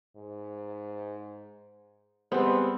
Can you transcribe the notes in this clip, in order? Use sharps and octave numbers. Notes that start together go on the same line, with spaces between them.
G#2
G3 G#3 B3 C4 B4 C5